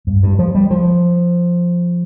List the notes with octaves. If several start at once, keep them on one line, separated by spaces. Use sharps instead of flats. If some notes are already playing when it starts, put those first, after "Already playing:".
G2
G2
F3
G3
F3